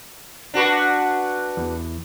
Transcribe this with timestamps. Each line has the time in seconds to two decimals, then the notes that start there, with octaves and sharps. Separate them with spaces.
0.54 D4 F#4 B4
1.57 E2